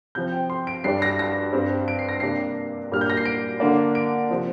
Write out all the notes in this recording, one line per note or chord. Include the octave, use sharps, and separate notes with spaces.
C3 F3 C4 G6
G5
C6
D7
G2 G3 D4 C7
A#6
A#6
G2 G3 C4
D7
C7
A#6
C3 A#3 D4 C7
A#2 G3 A#3 D4 F6
G6
A#6
C7
D7
D3 A#3 D4
D7
C3 F3 C4